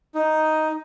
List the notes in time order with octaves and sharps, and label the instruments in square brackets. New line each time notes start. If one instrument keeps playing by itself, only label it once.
[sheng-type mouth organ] D#4